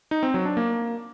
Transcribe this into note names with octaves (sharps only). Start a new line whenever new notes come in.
D#4
C4
F#3
D4
A#3